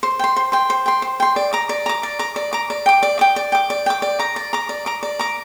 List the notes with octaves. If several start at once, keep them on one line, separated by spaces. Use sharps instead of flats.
C5
G5 C6
C5
G5 C6
C5
G5 C6
C5
G5 C6
D5
A#5 D6
D5
A#5 D6
D5
A#5 D6
D5
A#5 D6
D5
G5 D6
D5
G5 D6
D5
G5 D6
D5
G5 D6
D5
A#5 D6
D5
A#5 D6
D5
A#5 D6
D5
A#5 D6